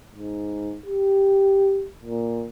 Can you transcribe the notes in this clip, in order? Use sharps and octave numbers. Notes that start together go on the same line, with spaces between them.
G#2
G4
A#2